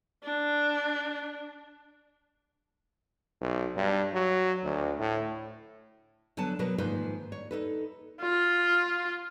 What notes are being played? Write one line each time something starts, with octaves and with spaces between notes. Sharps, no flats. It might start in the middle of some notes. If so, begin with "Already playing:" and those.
D4
B1
G2
F#3
D2
A2
D3 F#3 B3 B4 A5
B2 F#3 A#4 B4
G#2 D#3 F3 A#3 B4 C5
C#5
D#4 A4 B4
F4